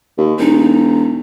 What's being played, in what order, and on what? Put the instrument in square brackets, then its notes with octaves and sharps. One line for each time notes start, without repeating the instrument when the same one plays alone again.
[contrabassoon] D#2
[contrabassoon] E1 [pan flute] D#4